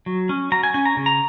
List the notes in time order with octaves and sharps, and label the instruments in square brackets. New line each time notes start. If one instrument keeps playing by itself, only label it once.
[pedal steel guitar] F#3
C#4
F#3 A#5
G#5
C#4 G#5
A#5
C#3
A#5